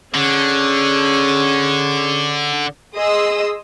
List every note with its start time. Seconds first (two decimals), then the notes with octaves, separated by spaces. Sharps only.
0.15 D3 C#4 G#4
2.95 G#4 D#5 C6 D#6 E6